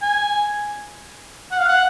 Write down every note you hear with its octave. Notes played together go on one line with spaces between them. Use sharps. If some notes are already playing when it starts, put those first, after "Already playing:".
G#5
F#5
F5
F#5